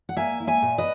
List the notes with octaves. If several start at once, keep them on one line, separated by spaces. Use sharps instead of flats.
F#5
A#3 E5 G#5
E4
E5 G#5
A#2
B4 D#5